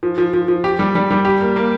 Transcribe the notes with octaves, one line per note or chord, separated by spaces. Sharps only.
F3
F3
F3
F3
G4
G3
G3
G3
G4
A#3
A#3